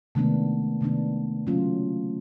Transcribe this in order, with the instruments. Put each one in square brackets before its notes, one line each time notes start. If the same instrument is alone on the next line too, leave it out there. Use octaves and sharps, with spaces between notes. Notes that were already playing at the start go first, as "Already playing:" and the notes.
[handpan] C3 D#3 G#3 B3 D4 [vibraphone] A3
[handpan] C3 D#3 G#3 B3 D4
C#3 F#3 A#3 C#4 F4